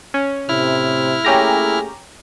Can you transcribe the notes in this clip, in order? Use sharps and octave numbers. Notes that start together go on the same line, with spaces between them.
C#4
A2 C3 E4 F6
A3 A#3 C#4 G4 G#4 A#5